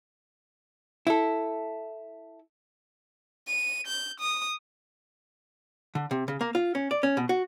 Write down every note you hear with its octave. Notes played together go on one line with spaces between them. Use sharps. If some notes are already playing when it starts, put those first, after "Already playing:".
E4 A4
D#7
G6
D#6
D3
C3
C#3
A#3
F4
C#4
D5
C#4
B2
F#4